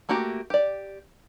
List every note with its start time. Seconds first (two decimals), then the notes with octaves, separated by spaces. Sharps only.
0.09 A3 A#3 F#4 G4
0.50 G4 D5